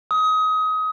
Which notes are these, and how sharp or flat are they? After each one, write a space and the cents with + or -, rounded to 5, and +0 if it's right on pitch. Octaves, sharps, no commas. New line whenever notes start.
D#6 +25